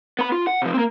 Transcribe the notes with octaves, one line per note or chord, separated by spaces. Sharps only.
B3 B5
F4
F#5
C3 F3
A#3 C4